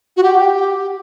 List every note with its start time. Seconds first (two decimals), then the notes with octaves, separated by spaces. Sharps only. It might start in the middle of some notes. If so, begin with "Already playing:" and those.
0.17 F#4
0.23 G4 F#5
0.36 F#5
0.41 G5